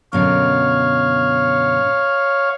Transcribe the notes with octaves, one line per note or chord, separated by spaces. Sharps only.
F#2 B2 D3 C#5 F5